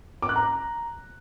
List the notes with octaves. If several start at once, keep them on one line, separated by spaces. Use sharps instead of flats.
D6
F#6
A#5